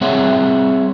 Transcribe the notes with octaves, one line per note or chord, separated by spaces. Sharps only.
G3 C4 G#4 C#5 E5 F#5